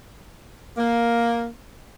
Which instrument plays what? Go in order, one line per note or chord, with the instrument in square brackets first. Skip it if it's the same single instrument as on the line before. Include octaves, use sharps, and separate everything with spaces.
[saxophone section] A#3